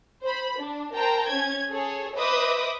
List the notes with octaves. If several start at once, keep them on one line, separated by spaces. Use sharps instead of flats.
C5 B5
D4
A#4 C5 G5 A5 A#5
C#4 G#6
G#4 A4 C#5
B4 C5 D#5 E5 D6 D#6